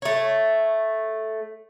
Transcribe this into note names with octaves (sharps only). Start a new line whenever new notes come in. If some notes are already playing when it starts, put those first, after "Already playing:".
A3 C#5